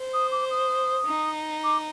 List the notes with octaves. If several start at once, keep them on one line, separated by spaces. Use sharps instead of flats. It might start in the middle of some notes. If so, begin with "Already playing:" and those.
Already playing: C5
D#6
D6
D#6
D#4
D6